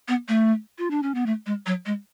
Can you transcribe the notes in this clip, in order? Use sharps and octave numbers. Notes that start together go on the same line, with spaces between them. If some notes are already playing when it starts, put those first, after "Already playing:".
B3
A3
F4
D4
C#4
B3
A3
G#3
F#3
G#3